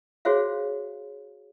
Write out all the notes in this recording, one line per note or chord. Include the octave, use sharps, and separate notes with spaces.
F#4 G#4 C5 C#5 E5 F5